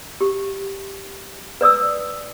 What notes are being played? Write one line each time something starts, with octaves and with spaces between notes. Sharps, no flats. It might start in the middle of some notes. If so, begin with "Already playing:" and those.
G4
B4 D5 D#6 E6